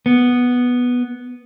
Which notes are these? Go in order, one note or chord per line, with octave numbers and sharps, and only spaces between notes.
B3